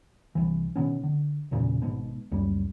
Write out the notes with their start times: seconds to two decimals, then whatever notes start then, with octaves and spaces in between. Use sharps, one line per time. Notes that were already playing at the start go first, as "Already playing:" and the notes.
0.35 C2 E3
0.76 B2 D#3 B3 C#4
1.04 D3
1.51 B1 E2 A#2 C#3
1.82 G#1 G#2 B2
2.31 C#2 F#2 G3